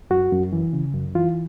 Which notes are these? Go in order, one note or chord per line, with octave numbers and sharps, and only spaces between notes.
F#2 F#4
F#2
E3
C#3
F#2
E3 F4